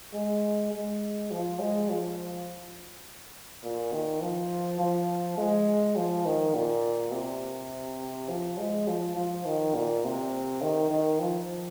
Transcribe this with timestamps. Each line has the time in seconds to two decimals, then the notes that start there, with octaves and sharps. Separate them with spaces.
0.14 G#3
0.72 G#3
1.31 F3
1.60 G#3
1.89 F3
3.63 A#2
3.93 D#3
4.22 F3
4.80 F3
5.38 G#3
5.96 F3
6.26 D#3
6.54 A#2
7.12 C3
8.29 F3
8.58 G#3
8.88 F3
9.17 F3
9.45 D#3
9.75 A#2
10.04 C3
10.62 D#3
10.90 D#3
11.20 F3